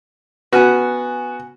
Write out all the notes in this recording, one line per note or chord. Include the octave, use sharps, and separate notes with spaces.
B3 C#4 F#4 F#5 G#5